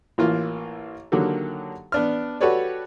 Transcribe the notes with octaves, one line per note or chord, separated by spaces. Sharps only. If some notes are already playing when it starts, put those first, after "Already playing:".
A1 E3 A#3 F4
D3 D#3 F#3 A#3 G4 A4
B3 D4 F6
F#4 G4 A4 B4 C#5 D5